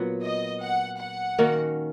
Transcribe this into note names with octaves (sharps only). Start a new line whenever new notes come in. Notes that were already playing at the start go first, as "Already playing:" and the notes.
Already playing: A#2 F#3 B3 F#4
D#5
F#5
F#5
D#3 A#3 C#4 F#4